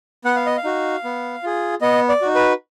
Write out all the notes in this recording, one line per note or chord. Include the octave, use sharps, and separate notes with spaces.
B3 F#5
F5
D#5
F5
D#4 F#4
B3
F4 G#4
B3 D#5
D5
D#4 F#4
B4